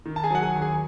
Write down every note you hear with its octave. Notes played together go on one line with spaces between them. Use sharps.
D#3
A5
G#4 G#5
F#3 F#5
G#4 G#5
D#2
G#4 G#5